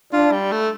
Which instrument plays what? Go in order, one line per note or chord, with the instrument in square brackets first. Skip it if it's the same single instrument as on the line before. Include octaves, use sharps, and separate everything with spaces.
[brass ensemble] D4 [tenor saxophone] F4
[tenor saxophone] G3
A3